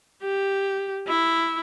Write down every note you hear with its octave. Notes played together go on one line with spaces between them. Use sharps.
G4
E4